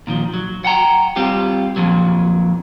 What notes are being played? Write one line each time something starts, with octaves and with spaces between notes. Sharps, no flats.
A#2 D#3 F3
F#3
F#5 G5 A#5
G3 C4 F4 G4
F2 A#2 F3 F#3